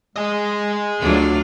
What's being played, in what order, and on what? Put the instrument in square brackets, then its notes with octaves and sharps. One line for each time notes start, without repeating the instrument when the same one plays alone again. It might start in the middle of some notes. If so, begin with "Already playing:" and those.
[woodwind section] G#3 [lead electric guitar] G#4 D#5
[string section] D2 F#3 [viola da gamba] D4 F4